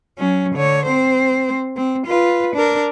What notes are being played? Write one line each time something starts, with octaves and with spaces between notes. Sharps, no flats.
F#3 C#4
D3 C#5
C4 C5
C4
F4 B4
D4 A#4